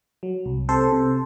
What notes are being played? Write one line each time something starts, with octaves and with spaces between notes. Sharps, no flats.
F#3
C2
C3 A4 C5
C3